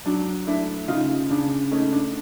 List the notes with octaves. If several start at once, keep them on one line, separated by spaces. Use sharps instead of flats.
F#3 D4
A3 D4 E4
C#3 D#4 F4
C#3 D4
A3 C#4 D#4
D4